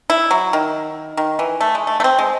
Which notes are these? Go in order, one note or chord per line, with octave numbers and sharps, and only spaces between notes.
E4
F#3
D#3
D#3
E3
A3
G#3
A3
A3
C4
G#3